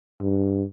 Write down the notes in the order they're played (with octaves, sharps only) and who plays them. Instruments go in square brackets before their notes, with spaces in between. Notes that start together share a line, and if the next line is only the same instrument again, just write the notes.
[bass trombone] G2